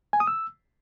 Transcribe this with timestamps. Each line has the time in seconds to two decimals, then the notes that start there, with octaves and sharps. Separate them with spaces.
0.13 G#5
0.20 D#6
0.27 E6